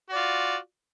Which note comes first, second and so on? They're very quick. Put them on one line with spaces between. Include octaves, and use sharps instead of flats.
F#4 D5 F4